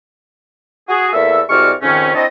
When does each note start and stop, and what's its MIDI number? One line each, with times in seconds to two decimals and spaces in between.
0.88 1.08 66
0.88 1.08 68
1.13 1.39 40
1.13 1.39 58
1.13 1.39 69
1.13 1.39 76
1.49 1.72 36
1.49 1.72 56
1.49 1.72 66
1.49 1.72 74
1.49 1.72 85
1.49 1.72 89
1.81 2.10 41
1.81 2.10 44
1.81 2.10 51
1.81 2.10 57
1.81 2.10 61
2.14 2.24 60
2.14 2.24 62
2.14 2.24 64
2.14 2.24 66
2.14 2.24 69
2.14 2.24 75